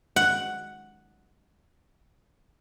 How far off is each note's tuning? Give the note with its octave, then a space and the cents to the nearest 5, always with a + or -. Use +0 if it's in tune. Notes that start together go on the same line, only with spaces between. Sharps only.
F#5 +0